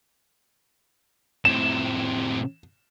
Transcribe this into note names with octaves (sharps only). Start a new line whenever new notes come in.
A2 C3 E7